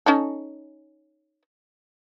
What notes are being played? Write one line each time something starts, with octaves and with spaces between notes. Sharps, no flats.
C#4 D#4 A4